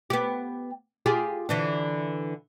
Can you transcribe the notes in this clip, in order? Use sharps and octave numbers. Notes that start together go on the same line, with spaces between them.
B3 G4
F4 G4 G#4
D3 E3 D4